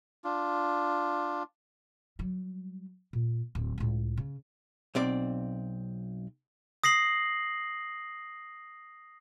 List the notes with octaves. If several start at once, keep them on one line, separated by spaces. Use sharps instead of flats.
D4 F4
F#3 G3
A#2
D1
C#2 A2
C#3
B1 C4 D5
D#6 A#6 C7 F#7